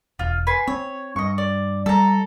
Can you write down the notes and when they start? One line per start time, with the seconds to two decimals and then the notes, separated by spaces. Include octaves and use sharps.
0.19 E1 F4
0.47 B4 G#5 C6
0.68 C4 C#5
1.16 G2 D#5 C#6
1.38 D5
1.86 G3 A4 A#5